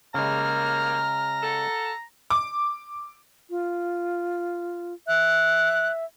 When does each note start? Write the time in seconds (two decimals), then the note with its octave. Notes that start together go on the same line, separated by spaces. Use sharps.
0.14 C#3 G3 G#3 A#3 A#5 F6
1.42 F#4 A4
2.30 D6
3.50 F4
5.07 E5 F#6